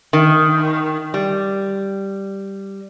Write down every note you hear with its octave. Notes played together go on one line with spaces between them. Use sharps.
D#3
G3